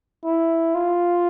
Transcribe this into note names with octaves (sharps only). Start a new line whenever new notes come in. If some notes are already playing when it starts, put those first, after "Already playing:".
E4
F4